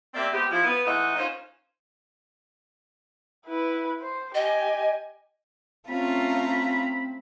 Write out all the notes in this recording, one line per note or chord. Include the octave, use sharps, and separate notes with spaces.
A#3 C4 G4 D5 E5
G#3 B3 C4 G4
F3 E4
B3
G#2 E3 A3 B4 D#5 F#5
C#4 D#4 F4 A#4 C5 C#5
E4 B4
C5
G4 D#5 G#5
A3 C4 C#4 F4 A#5 B5